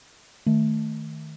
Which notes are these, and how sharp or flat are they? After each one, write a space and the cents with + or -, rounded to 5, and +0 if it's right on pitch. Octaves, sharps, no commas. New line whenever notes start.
D#3 +0 A3 +0